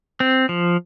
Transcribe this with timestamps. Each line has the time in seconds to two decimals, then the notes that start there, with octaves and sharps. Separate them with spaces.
0.20 C4
0.49 F3